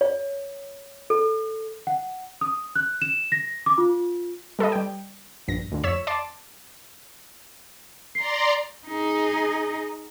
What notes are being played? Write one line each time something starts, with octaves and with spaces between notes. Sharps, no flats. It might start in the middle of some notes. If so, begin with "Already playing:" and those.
C#5
A4
F#5
D#6
F#6
E7
A#6
D6
F4
G3 A4 B4 D#5
G3 G5
A#1 G2 A#6
D2 D3
F2 C#5 E6 B6 E7
D5 A5 C6 D6
D5 A#5 C6 C7
D#4 G#4